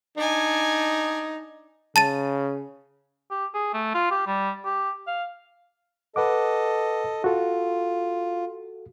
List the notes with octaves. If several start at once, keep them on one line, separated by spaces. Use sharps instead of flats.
D4 D#4 G#5
C#3 A5 A6 D#7
G4
G#4
A3
F4
G4
G3
G4
F5
A4 B4 D#5 F#5 D6
F4 F#4 A4